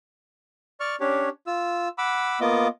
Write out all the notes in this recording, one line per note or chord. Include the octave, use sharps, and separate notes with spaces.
D5 C#6 F6
C#4 D4 G4 C#5
F4 E6
F#5 B5 D6 E6
A#3 B3 F4 D#5 D6